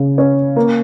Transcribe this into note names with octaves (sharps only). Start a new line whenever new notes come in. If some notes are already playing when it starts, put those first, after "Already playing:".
Already playing: C#3
C#4
A#3